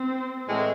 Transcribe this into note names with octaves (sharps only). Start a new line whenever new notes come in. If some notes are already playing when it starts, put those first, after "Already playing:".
Already playing: C4
A2 E3 G#3